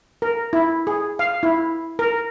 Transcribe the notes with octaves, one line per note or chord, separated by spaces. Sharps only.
A#4
E4
G#4
F5
E4
A#4